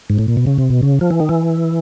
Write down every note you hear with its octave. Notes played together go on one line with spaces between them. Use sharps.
G#2
A2
A#2
B2
C#3
C3
B2
C#3
F3
E3
D#3
E3